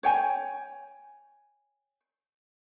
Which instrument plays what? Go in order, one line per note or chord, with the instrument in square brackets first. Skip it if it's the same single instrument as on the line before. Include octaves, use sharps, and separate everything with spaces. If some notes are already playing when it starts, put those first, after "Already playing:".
[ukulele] C#5 G5 G#5